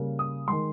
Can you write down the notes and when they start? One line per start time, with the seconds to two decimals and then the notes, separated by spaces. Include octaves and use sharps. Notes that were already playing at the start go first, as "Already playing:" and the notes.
Already playing: C#3 G3 A#3
0.19 D#6
0.48 D#3 G#3 C6